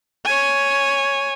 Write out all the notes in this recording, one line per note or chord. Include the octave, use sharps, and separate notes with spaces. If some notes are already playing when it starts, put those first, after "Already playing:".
C#5 G#5